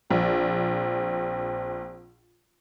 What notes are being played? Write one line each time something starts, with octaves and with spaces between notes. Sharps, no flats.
A#1 C4